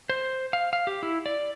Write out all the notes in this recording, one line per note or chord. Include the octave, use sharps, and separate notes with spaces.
C5
F5
F5
G4
E4
D5